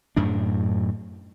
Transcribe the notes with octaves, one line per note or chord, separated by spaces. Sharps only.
F#2 A2 D4